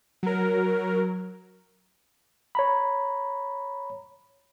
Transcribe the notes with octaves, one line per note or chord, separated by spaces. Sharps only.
F#3 A#4
C#5 A#5 B5